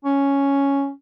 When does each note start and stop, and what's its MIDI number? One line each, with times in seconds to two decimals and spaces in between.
0.05 0.89 61